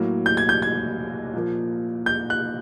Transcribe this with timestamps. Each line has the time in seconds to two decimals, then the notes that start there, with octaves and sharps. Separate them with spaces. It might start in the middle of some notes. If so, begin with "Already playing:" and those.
Already playing: A2 F#3 A#3
0.26 G6
0.37 G#6
0.49 G6
0.62 G#6
1.33 A#2 F3 A#3
2.06 G6
2.30 F#6